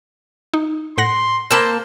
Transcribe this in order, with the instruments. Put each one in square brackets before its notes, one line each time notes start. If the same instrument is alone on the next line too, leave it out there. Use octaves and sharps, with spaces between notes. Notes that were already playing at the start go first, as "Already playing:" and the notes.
[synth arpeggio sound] D#4
[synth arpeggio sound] A2 F#5 A#6 [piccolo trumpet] C6
[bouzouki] A#3 A5 [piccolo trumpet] C5 [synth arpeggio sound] B5 E6